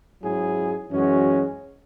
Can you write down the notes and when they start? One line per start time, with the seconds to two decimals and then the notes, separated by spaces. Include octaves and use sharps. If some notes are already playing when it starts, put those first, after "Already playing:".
0.21 G#2 F#3 C#4 E4 G#4
0.89 F#2 E3 G#3 C#4 F#4